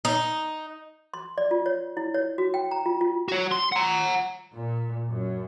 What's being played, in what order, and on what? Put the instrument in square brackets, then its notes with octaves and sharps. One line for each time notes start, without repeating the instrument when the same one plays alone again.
[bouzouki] D#4
[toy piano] C6
D5
F4
C#5
E4
C#5
F#4
G5
A#5
F4
F4
[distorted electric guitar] F#4 C#5
C6
F#5 A#5
[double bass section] A#2
F#2